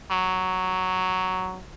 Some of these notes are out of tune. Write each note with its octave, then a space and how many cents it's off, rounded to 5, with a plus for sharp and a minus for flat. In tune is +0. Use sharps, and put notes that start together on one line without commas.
F#3 +5